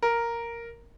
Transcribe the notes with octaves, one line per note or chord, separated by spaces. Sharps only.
A#4